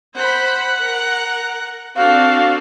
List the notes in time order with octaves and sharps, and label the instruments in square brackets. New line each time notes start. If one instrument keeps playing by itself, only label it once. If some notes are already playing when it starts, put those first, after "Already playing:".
[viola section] C5 B5 [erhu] F#5
[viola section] A#4
[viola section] C4 D4 A4 [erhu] F#4 [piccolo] F5